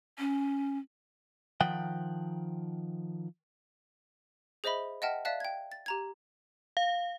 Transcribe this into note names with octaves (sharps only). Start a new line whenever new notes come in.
C#4
D#3 F3 F#5 G5
G#4 C5 D#5 E5 B5
D#5 E5 F#5 G5 A5 F6
D5 E5 F5 A5 F#6
G5 G#6
A6
G4 A#5 G#6
F5